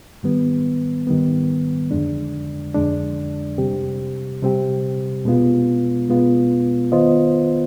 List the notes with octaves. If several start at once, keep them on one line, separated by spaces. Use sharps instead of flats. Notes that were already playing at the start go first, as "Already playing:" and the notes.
G#2 D#3 G3 B3
G#2 D#3 G3 B3
F2 D3 G#3 D4
F2 D3 G#3 D4
C3 G3 C4 G4
C3 G3 C4 G4
B2 G#3 B3 F4
B2 G#3 B3 F4
D#3 B3 F4 C5 D#5